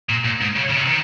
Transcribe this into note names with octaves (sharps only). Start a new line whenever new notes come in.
A#2
A#2
G#2
C#3
C#3
C3
D#3